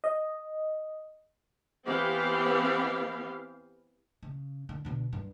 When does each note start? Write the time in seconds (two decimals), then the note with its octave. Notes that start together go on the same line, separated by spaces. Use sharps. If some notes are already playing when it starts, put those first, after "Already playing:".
0.04 D#5
1.86 E3 B3 C4 G4 F5
4.23 C#3
4.69 D3
4.85 B2 D3
5.13 G2